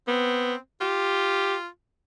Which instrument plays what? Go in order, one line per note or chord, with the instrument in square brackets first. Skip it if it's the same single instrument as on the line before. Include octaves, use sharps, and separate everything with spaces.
[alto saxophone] B3 [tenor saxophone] C4
[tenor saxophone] F4 [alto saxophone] G4